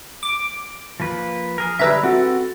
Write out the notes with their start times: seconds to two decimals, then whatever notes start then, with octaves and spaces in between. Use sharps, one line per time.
0.23 D6
1.00 F3 A#3 B4
1.58 G#4 A#4
1.79 D3 G3 G#3 B4 E5 A#5
2.03 C4 F#4 A4